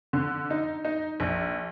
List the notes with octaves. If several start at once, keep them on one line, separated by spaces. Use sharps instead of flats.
D3
D#4
D#4
A#1